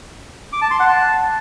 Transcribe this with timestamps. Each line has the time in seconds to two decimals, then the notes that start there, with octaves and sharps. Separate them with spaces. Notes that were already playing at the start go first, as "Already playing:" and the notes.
0.53 D6
0.62 A5
0.71 C6
0.80 F#5
0.89 A5